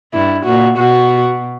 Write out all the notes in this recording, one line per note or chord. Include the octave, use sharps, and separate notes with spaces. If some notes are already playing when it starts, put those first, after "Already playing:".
G2 E4
A#2 F#4
B2 F#4